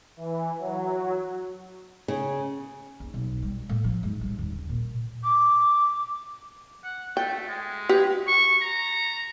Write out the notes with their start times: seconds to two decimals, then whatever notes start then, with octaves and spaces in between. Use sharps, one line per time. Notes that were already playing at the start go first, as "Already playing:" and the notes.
0.17 E3
0.59 F#3
2.08 C#3
3.00 D#2
3.14 B1
3.42 G3
3.69 A2
3.84 F3
4.03 G#2
4.21 G3
4.38 D#2
4.52 C#3
4.69 A#2
5.23 D6
6.83 F#5
7.17 A3 G5
7.48 G#3
7.89 G4 B4
8.27 C#6
8.61 A#5